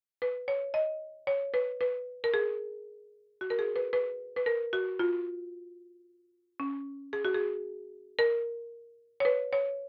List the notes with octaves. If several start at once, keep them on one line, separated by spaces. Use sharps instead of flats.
B4
C#5
D#5
C#5
B4
B4
A#4
G#4
F#4
A#4
G#4
B4
B4
B4
A#4
F#4
F4
C#4
G#4
F#4
G#4
A#4
C#5
B4
C#5